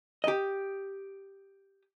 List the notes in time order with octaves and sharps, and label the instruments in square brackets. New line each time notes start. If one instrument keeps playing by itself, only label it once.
[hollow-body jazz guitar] G4 D#5